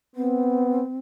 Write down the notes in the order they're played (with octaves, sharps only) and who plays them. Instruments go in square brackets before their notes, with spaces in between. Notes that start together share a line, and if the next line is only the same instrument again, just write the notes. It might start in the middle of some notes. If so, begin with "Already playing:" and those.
[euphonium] B3 [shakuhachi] C4